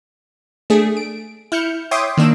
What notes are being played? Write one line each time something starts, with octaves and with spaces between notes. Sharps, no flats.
A3 D4 G#4
D7
E4 F6 G6 C#7
C#5 E5 G5 C6 D6 D#6
D#3 A#3 D4 E6